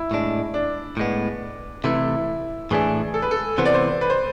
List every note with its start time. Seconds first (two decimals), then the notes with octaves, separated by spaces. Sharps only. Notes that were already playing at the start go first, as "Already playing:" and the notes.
Already playing: E4
0.11 A2 G#3 D4
0.54 D4
0.97 A2 G#3 B3
1.84 C3 E3 A3 E4
2.71 A2 E3 A3 D4 G#4
3.14 A4
3.22 B4
3.31 A4
3.58 C3 E3 B3 C5
3.65 D5
3.74 C5
4.01 B4
4.10 C5